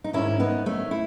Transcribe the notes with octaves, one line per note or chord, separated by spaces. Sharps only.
D#4
G#2 D#3 C#4 E4
B3 D#4
A3 C#4
E4